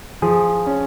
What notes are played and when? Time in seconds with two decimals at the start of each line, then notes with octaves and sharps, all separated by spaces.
0.22 F3 G#4
0.67 C#4